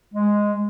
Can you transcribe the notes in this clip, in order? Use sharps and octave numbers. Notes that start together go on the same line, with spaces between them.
G#3